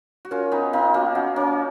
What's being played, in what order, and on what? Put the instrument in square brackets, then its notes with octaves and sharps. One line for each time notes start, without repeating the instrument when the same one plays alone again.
[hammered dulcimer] F#4
[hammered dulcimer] C#4 F4 [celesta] A#4
[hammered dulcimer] B3 D#4 [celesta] G#5
[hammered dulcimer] B3 D#4 [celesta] F5
[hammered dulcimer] A#3 C#4 [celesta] F#4
[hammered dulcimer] C#4 F4 [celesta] F#5
[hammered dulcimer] A#3 C#4 [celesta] C#5